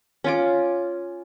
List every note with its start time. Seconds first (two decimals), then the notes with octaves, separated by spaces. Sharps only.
0.24 C#4 F4 D6